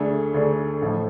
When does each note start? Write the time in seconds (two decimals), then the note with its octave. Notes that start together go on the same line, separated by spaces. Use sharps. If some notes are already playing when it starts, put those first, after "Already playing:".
Already playing: D2 D3 A3 D4 G#4
0.34 D2 D3 A3 D4 G#4
0.82 A1 A2 F3 A3